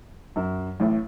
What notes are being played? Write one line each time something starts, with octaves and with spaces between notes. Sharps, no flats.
F#2
A1 A2